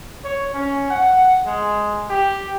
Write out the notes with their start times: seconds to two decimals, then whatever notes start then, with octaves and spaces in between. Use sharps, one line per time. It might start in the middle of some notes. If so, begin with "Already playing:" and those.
0.24 C#5
0.54 C#4
0.90 F#5
1.46 G#3
2.09 G4